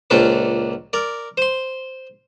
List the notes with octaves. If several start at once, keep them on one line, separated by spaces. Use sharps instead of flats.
C#2 A#2 C#4 D4 C5 D6
A#4 D5
C5 C6